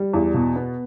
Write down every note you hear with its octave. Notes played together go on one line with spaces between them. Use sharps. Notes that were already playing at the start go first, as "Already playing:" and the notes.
Already playing: G3
E2
B2
B3